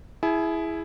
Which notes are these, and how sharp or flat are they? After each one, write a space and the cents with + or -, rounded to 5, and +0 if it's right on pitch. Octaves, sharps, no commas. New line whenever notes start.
E4 +0 G#4 +0 G#5 +40